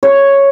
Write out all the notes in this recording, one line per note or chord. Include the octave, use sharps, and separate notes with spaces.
C#5